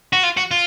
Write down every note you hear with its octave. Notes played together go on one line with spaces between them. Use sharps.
F#4
F4
F#4
F4